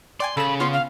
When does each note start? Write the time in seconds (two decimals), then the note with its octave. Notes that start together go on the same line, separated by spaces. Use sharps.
0.20 D5 G5 G#5 C6
0.37 C#3 A4 B5 E7
0.60 B3 C#4 F4 C6
0.73 F5